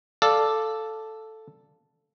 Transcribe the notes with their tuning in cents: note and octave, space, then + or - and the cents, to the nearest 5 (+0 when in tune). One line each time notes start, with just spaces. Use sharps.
A4 +0 D5 +0 F5 +0